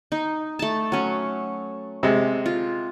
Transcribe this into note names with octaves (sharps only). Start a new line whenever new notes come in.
D#4
A3 A5
F#3 C#4
C3 G#3
F4